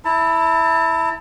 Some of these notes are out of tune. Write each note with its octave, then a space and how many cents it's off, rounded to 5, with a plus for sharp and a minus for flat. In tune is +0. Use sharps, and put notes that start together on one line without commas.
E4 -5 A5 +35